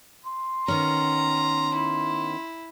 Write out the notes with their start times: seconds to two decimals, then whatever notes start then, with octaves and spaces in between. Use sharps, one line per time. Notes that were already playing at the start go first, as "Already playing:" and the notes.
0.25 C6
0.68 D#3 B3 C#4 A#5
1.75 E4